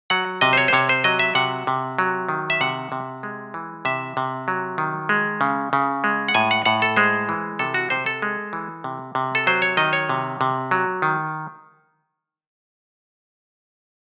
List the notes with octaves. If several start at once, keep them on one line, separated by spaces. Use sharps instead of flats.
F#3 F#5
C3 D#5
C5
C#5
C5
C3 C#5
C5
F#3 D#5
E5
C3 F#5
C3
F#3
D#3
E5
C3 F#5
C3
G#3
E3
C3 E5
C3
F#3
D#3
G#3
C#3
C#3
G#3
F#5
A2 G#5
F#5
A2 F#5
A4
G#3 C5
E3
C3 A4
F#4
C3 C5
A4
G#3
E3
C3
C3
A4
F#3 C5
C#5
D#3 D#5
C#5
C3
C3
F#3
D#3